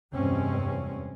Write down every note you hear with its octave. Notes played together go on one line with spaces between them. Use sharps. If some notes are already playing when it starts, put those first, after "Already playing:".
F1 E2 G2 G#3 C4 C#4